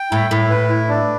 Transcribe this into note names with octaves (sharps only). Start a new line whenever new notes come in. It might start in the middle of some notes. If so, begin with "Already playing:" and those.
Already playing: G5
A2 E4
A2 E4
B4
E4
D4